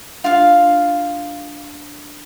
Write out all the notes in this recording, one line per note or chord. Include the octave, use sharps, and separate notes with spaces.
D4 F4 F5